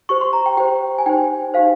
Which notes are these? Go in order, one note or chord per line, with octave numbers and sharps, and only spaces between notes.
G4 C5 C#6
C6
A#5
G5
G4 C5 G5
G#5
D#4 G4 C5 G5
D#4 G4 C5 F5